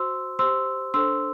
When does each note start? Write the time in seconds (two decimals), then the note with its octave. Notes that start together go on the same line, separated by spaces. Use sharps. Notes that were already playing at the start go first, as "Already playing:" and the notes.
Already playing: F#4 C5 C6 E6
0.39 G4 C5 C6 E6
0.94 D4 A4 C5 C6 E6